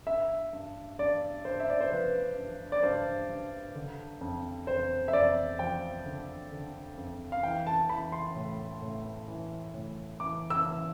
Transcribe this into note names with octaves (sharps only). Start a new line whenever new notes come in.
G2 E5
G2
G2 D5
G2 C5
E5
D5
C5
F3 B4
G2
D5
G2 C5
G2
D3
F2
F2 C5
E5
F2 D5
F3 G5
D3
D3
F2
F5
E3 G5
A5
E3 B5
C6
A2
A2
E3
A2
E3 D6
E6
E3